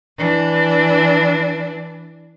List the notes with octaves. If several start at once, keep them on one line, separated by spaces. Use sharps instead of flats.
E3 D4